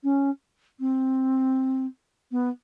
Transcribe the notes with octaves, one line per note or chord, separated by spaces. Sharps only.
C#4
C4
B3